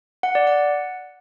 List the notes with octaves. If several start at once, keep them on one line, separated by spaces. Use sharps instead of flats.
F#5
D5
F#5